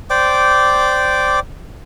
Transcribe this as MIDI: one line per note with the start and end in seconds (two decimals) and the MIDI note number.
0.10 1.40 72
0.10 1.40 74
0.10 1.40 79
0.10 1.40 86